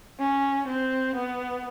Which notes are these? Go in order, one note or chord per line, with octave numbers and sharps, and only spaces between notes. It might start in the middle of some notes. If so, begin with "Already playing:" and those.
C#4
C4
B3